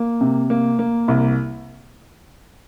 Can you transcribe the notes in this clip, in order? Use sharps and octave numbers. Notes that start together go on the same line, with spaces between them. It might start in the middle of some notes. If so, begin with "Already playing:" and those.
Already playing: A#3
C3
A#3
A#3
C2